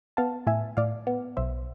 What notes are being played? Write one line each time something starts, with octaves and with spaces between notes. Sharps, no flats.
B3 F5 A5
A2 E5 G#5
A2 D5 F5
B3
B1 C5 E5